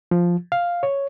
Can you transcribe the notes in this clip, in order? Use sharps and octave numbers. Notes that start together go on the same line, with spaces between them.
F3
F5
C#5